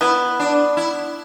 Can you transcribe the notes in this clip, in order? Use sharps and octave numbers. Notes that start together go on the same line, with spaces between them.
B3 E4
D4
E4